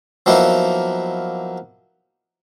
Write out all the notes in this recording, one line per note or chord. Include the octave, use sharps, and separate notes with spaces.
F3 F#3 A#3 B3 D#4 E4